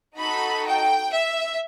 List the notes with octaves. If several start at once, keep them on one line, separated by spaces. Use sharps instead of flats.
D#4 F#4 A4 B5
G5
E5